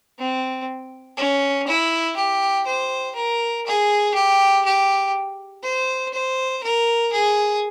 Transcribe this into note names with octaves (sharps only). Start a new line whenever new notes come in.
C4
C#4
E4
G4
C5
A#4
G#4
G4
G4
C5
C5
A#4
G#4